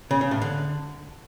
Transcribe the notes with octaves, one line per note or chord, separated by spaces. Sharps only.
C#3
C#3
A2
D3